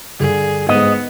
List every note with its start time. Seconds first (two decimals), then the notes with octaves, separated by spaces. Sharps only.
0.20 G2 D3 G#4
0.69 G#2 B3 D#5